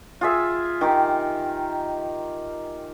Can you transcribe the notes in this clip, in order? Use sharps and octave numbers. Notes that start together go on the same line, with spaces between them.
F4 G#4 E5
D#3 G4